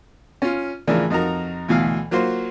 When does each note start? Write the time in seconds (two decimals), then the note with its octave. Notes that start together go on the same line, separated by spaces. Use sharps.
0.42 C#4 F4
0.87 A2 C#3 E3 F3 D4 A#4
1.10 F2 D#4 F#4 A#4 A#5
1.68 D2 B2 E3 F5
2.11 F#3 A#3 F4 F#4 C5